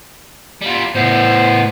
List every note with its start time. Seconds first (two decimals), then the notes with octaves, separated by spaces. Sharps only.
0.62 G3 F4
0.95 A2 B3 C5